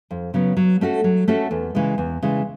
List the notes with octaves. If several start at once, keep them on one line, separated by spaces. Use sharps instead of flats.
F2
C#3 F#3 B3
F#3
A3 C#4 F#4 A4
F#3
A3 C#4 F#4 A4
E2
C#3 E3 G#3
E2
C#3 E3 G#3